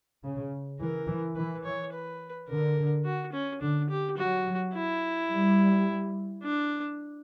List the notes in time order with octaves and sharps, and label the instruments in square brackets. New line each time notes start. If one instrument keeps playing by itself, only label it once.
[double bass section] C#3
[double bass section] E3 [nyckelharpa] A#4
[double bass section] E3
[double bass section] E3 [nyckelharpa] B4
[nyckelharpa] C#5
B4
[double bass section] D3 [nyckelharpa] A#4
[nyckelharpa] F#4
C#4
[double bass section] D3 [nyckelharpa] D4
[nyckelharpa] G4
[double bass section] F#3 [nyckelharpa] F#4
[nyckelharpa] E4
[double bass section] G3
[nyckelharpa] D4